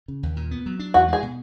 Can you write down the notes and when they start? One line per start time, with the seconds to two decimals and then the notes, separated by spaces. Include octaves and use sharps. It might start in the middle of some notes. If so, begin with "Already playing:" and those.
0.08 C#3
0.23 D#2
0.36 A#2
0.51 B3
0.66 F#3
0.79 D4
0.94 E2 F#4
1.08 G#3 G#4
1.22 B2